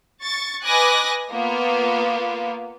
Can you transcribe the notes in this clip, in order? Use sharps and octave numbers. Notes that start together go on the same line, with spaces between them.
C#6 A6
B4 D#5 G#5 D6 F#6 A#6
A#3 B3 F4